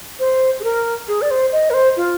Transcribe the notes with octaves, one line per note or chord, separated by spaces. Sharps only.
C5
G#4
A#4
G#4
D5
C5
D#5
A#4
C5
F4